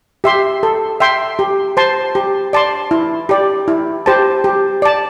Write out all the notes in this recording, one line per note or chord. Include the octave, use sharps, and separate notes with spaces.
G4 E5 C6
A4
E5 G5 C6
G4
C5 A5 C6
G4
D5 A5 C6
E4
G4 D5
E4
G4 C5 A5
G4
D5 A5